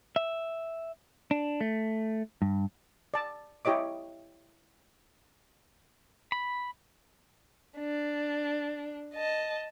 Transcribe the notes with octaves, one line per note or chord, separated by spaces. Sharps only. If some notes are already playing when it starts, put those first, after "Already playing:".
E5
D4
A3
G2
D5 A5
E4 G4 C#5 D#5 D6
B5
D4
D#5 A5